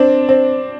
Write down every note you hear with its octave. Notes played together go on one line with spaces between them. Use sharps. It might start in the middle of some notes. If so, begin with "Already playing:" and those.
Already playing: C4 D4
C4